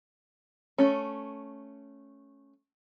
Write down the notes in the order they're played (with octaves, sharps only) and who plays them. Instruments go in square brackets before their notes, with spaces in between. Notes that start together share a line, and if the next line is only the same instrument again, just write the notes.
[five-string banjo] A3 C#4